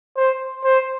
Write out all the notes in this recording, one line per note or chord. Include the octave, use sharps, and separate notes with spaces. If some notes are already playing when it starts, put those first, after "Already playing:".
C5
C5